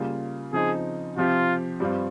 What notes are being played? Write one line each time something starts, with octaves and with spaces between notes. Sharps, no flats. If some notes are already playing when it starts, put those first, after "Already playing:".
Already playing: C#3 G3 A#3 F4
C#3 F3 C4 D#4 G#4
C3 F3 C4 F4 G4
G2 G3 C4 F4